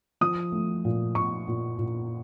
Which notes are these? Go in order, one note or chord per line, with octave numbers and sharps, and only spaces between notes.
F3 D#6
A3
A#2
A#2 C#6
A#2
A#2